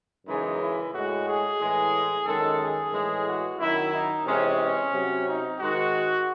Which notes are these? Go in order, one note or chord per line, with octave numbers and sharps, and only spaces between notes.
F#2 C#3 E3 G#3 D#4
E4
A2 G#3 F#4
G#4
A2 E3 G#3
F#2 D#3 G#3 A4
G#4
A2 E3 G#3
F#4
F#2 D#3 F#3 E4
D#4
C3 E3 G#3 C#4
C#4
C3 F#3
D#4
G#2 D#3 G#3 F#4